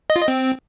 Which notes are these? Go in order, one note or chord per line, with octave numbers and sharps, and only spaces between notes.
D#5
F4
D#5
C4